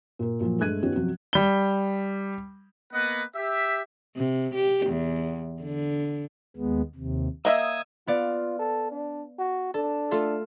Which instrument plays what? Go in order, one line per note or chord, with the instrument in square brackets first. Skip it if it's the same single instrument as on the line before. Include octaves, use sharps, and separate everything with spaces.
[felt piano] A#2 A#4
A#2 F3 F#3 F4
G2 G#3 A3 F#6 G#6 D#7
D#3 B3 C#4 F4 G4 C#5
C3 F3 F#3 F#4
[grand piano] G3 G7
[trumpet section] A#3 B3 B4 D#5 F#5
G4 E5
[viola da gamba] C3
G4
E2
D3
[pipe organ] D#2 G#3 B3
D#2 C3
[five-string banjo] A#3 D#5 E5 [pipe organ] D#6 E6 G#6
[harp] B3 D5 F5 [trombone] F4
[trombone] A4
D4
F#4
[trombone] D4 [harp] A4
[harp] A3 F4 A4